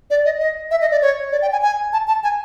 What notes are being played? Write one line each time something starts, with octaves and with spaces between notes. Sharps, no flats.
D5
D#5
D#5
E5
D#5
D5
C#5
D5
G5
G#5
G#5
A5
A5
G#5